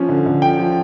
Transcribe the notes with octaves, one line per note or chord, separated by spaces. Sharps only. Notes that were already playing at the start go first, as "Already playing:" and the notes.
Already playing: F3 C#4
D3
D3
F3 G5
F3